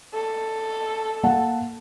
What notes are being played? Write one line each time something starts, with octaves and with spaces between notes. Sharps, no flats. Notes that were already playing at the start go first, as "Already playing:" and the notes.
A4
A#3 F#5 A5